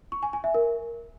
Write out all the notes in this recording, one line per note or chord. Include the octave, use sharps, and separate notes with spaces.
C#6
G#5
G#5
E5
A#4